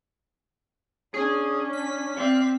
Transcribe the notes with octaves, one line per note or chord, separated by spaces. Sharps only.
C#4 D4 G#4
B6
C4 D5 F5